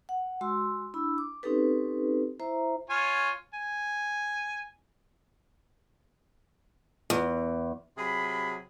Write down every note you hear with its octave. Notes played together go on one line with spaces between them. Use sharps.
F#5
G#3 F#4 C6 E6
D4 E4 B5 E6
D6
C4 C#4 D#4 G4 A4 B4
E4 C5 E5 A#5
F4 C#5 G#5
G#5
E2
C3 F#3 G#4 B5